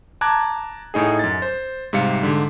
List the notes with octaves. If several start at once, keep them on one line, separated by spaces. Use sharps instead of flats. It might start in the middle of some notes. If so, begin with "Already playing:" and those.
A5 A#5 D6 F#6 G#6
A2 D#4 G#4
F#2 A6
C5
G#2 C3 G3 F5 C#7
G#2 D3